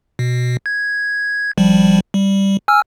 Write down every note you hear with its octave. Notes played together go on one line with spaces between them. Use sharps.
B2
G#6
G#1 F3 G3
G3
G#5 E6 F6